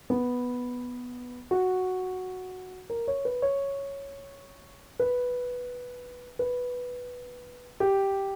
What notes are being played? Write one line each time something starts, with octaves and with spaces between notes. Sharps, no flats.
B3
F#4
A#4
C#5
B4
C#5
B4
B4
G4